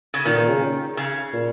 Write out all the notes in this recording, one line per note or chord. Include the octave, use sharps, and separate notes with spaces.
C#3
A#2 D#3
A#2
C#3
C#3
A#2